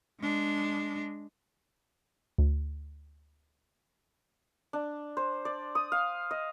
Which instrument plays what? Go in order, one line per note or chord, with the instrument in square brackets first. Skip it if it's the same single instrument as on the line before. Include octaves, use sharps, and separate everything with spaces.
[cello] G#3 D4
[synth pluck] D2
[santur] D4
C5
D5
D#6
F5
D#5